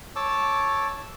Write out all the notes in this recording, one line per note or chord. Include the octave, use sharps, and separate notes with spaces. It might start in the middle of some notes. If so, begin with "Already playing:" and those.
C#5 A5 D6 E6